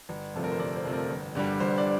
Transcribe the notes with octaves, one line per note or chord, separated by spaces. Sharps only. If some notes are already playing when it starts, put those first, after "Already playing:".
G1
F2 C3 F3 A3 A4
A#4
C5
G1 D5
C5
F2 C3 F3 A3
A#4
G1
G2 D3 G3
G1 C5
D5